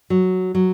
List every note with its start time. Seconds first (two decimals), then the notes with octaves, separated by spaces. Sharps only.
0.10 F#3
0.55 F#3